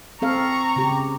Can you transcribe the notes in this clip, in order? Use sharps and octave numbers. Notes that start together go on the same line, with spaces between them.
C4 A4 F5 A#5 C#6
C#3 G4